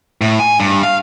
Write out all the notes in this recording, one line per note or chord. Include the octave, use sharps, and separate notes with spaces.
A2
G#5
G2
F5